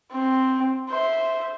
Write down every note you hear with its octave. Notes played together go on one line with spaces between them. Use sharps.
C4
C5 E5